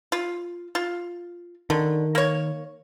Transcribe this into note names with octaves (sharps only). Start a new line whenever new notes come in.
F4
F4
D3 D#3
A#3 C#5